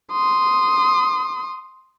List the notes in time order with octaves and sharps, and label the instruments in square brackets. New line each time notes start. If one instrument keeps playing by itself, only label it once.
[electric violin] C6 D#6